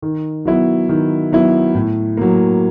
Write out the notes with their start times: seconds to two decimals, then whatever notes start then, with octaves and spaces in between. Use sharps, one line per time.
0.02 D#3
0.45 F#3 B3 E4
0.89 D#3
1.32 F#3 B3 E4
1.75 A2
2.17 F#3 A#3